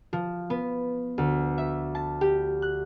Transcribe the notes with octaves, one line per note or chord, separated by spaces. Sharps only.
F3
B3
D2
E5
A5
G4
F#6